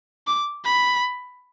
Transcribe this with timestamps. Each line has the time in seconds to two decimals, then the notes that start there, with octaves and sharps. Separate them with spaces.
0.27 D6
0.65 B5